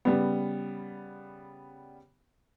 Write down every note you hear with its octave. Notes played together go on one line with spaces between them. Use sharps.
C#3 G3 B3